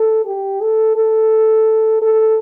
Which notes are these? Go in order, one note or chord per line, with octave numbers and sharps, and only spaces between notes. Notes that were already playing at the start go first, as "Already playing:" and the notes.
Already playing: A4
G4
A4
A4
A4